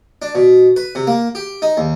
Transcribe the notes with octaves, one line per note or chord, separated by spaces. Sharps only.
D4
B2
B4
C3
A#3
G4
D#4
D#2